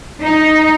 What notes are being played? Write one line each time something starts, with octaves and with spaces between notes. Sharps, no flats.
D#4